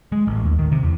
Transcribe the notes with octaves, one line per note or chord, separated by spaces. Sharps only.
G#3
A1
D#2
D#3
C3
E2